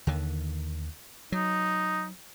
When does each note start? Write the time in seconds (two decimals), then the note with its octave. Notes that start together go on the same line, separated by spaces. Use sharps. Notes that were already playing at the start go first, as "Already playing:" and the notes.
0.07 D#2 D3 D#3
1.32 F#3 D#4